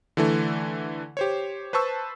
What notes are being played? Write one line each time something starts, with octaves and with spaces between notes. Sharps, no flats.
D3 E3 A3
G4 C5 C#5
B4 C5 A5 C#6 E6